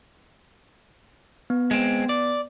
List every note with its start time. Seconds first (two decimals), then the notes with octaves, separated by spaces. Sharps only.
1.50 B3
1.71 G#3 C4
2.09 D5